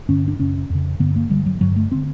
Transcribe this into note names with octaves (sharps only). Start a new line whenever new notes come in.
G2 D3 C#4
D4
F#2 C#3 C#4
F2 C#3
G2 D3 B3
A#3
G2 D3 G3
F#3
G2 D3 F#3
A3
D3 C4